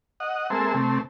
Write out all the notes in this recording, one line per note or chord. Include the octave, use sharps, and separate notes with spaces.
D#5 F#5
G#3 A#3 C4 A4 C5 E5
C3 A3 C4